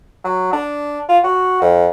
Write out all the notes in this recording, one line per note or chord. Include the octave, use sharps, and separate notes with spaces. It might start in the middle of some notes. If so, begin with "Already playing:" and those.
F#3
D4
F4
F#4
F2